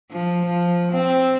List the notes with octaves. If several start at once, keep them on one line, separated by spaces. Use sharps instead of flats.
F3
F3
C4